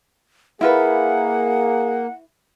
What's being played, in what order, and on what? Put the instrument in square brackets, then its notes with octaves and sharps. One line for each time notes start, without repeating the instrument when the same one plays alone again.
[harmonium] A#3 [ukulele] E4 F4 B4 [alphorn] G#4 [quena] F#5